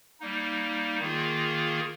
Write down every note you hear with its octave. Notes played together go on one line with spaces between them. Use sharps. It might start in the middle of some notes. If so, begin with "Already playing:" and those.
G3 A#3 D#4
D#3 A#3 F4 G#4